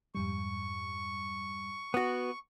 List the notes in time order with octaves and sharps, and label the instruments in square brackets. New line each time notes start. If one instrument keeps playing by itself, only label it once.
[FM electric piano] F2 G#2 G3 [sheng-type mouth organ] C#6
[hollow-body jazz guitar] B3 F#4